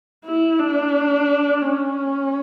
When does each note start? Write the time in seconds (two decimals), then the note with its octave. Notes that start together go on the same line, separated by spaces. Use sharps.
0.25 E4
0.59 D4
1.62 C#4